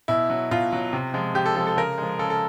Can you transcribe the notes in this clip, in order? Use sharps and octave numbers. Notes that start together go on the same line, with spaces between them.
B2 E4
F#3
B2 F4
F#3
C3
F3 G#3
C3 G4
A4
F3 G#3 A4
A4
C#3 A#4
F3 G#3
C#3 A4
A4